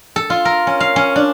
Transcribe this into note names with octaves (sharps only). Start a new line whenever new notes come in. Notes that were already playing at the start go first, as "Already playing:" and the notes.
A4
F4
A#4
C#4
F5
C#4
D4